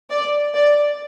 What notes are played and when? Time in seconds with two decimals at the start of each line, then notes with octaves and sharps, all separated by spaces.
0.10 D5
0.55 D5